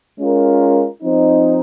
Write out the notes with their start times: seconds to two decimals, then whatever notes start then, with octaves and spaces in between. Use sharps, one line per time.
0.19 G#3 C#4 F4 A#4
1.03 F3 C4 D#4